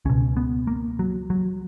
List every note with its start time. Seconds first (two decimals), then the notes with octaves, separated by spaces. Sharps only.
0.05 C#2 B2 C#4
0.37 B3
0.67 A#3
0.99 F#3
1.30 F#3